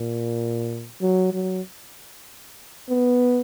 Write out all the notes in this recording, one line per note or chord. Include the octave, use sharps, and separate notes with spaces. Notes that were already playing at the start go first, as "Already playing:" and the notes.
Already playing: A#2
F#3
F#3
B3